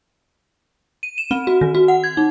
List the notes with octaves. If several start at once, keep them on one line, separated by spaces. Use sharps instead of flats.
D#7
E7
C4
F#4
D#3
F#4
F#5
G#6
D#4